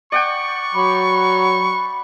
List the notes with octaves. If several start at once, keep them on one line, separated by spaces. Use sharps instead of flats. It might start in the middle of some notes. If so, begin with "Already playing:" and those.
D5 F#5 G5 C#6
F#3 B5